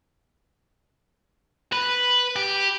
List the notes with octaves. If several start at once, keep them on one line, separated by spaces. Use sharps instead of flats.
B4
G4